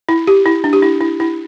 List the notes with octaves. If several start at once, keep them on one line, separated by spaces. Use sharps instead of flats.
E4
G4
E4
D4
G4
E4
E4
E4